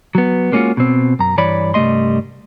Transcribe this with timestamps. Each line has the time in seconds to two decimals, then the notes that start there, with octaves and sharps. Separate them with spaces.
0.15 F#3 B3
0.52 G#3 A#3 C#4 D4 F4 F#4
0.77 B2 C4
1.19 F#2 A#5
1.37 G2 E3 C#5 D5 B5
1.74 C2 G2 G3 A3 D#5 C6